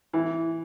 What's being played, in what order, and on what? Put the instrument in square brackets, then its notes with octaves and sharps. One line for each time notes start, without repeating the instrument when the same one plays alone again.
[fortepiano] E3